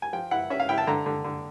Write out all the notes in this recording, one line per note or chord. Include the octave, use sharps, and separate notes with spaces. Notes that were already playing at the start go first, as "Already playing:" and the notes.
G#5
F3 G5
E4 F#5
C#4 E5
F5
E4 G5
A5
D3 A#5
D3
D3